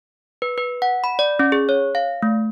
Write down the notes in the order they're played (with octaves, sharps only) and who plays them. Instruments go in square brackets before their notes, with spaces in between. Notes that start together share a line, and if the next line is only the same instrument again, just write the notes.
[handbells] B4
B4
F#5
B5
D5
C#4
G#4
C#5
F5
A3